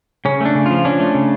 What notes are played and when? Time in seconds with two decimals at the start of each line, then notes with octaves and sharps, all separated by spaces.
0.25 C#3 C#4
0.41 A3 D4
0.55 C#3
0.66 F3 F4
0.85 C#4 D4
1.00 A3
1.15 C#3